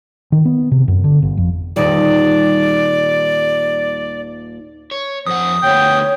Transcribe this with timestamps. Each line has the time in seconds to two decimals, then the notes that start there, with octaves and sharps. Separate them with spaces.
0.32 D#3
0.45 B3
0.72 C3
0.88 F#2
1.04 D3
1.22 G1
1.37 F2
1.76 D#1 G3 D#4 D5
4.91 C#5
5.26 F2 C5 F#5 D#6
5.63 D2 B3 C#5 G5